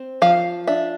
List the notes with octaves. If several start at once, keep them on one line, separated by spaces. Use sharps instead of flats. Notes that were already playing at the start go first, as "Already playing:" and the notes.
Already playing: C4
F3 F5
D4 E5